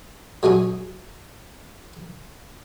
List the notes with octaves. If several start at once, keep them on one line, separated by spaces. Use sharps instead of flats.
F#3 G#3 C#4 G#4